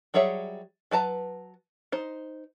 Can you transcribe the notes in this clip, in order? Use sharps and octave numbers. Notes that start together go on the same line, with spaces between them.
F#3 G3 G#4 C#5 E5
F#3 B4 A5 A#5
D#4 C5